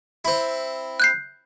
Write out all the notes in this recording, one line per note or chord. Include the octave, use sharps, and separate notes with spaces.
C4 E4
F#6 G6 C7